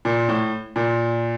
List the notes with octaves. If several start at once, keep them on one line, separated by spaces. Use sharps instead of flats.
A#2
A2
A#2